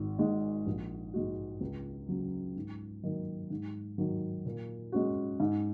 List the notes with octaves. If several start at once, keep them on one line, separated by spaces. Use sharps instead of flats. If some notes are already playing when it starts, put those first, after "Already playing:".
Already playing: G#1
G#2 G#3
A#1
G#2 G#3 F#4
C#2
C#3 F#3
G#2
D#3 F#3 A#3 D#4
G#2
D#3 F#3
A#2
G#3 C#4 F#4
G#2